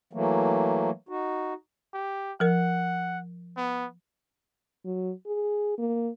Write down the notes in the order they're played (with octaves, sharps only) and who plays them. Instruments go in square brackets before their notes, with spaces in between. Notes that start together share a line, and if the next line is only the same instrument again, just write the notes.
[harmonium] E3 F#3 A3 A#3
D#4 F#4
[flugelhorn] G4
[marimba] F3 A#4 [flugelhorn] F#5
[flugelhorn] B3
[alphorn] F#3
G#4
A#3